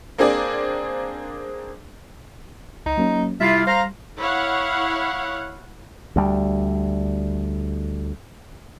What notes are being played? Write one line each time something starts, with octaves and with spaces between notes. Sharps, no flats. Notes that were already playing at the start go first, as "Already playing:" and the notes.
A#3 C4 D4 G#4 D5
C#2 D#4
F#3 A#3 C#4
C3 G3 E4 F4 E5
C5 F5 A#5
E4 C#5 F5 F#5
D2 G3